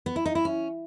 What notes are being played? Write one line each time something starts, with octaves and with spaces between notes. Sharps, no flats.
B3
E4
D#4
E4
C#4